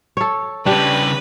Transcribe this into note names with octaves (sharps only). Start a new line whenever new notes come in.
A4 C#5
C#3 G3 D4 G4 B4